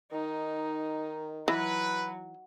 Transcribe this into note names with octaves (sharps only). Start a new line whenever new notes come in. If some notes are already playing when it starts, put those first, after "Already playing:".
D#3 D#4
E3 F#3 B4